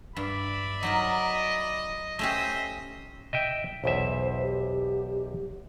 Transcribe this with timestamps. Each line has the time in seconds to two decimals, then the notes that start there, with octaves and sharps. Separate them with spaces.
0.16 G2 D5 E5 B5
0.83 F#3 D#4 A#4 D#5
2.19 A3 C#4 G4 C5 D#5 E5
3.33 D#5 E5 G5
3.84 B1 E2 C5 E5
4.44 G4